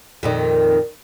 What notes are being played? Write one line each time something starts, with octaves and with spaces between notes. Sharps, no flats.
F2 A#2 D#3